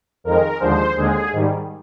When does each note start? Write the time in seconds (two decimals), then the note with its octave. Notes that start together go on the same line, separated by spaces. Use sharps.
0.24 F2 D#3 G#3 A#4
0.60 D#2 D3 F3 G#3 C5
0.96 D#2 D3 G#3 G#4
1.32 G#2 D#3 G3